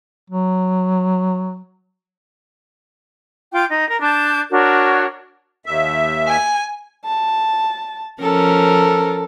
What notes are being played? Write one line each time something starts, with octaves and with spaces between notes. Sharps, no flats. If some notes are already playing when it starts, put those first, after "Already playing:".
F#3
F4 G5 D6 G6
D#4
A#4
D4 A5 G6
D4 F#4 A#4 C#5
D#2 E5
G#5
A5
F3 C#4 A4 A#4